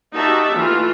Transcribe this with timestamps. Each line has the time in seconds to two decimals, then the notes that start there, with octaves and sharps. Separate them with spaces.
0.15 D#4 F#4 G4 E5 A5
0.57 E3 A3 F4